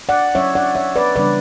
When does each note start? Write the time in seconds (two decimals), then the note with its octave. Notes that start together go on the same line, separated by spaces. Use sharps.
0.09 D5 F#5
0.35 F#3 C#4 C#5 E5
0.55 D5 F#5
0.75 C#5 E5
0.96 B4 D5
1.16 C#3 E3 G3 B3 D4 B4 D5